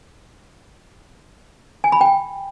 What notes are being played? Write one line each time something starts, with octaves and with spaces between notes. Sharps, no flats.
G#5
B5
G5